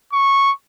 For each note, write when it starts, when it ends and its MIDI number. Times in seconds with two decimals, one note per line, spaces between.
0.13 0.51 85